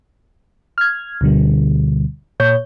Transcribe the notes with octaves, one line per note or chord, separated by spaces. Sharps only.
F6 G#6
D2 B2 D3 G3
A#2 C#5 G6